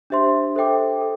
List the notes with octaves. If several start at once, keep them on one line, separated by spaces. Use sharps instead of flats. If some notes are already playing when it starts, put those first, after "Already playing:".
D4 G4 C5 E5 C6
A4 C5 E5 G5 D6
A4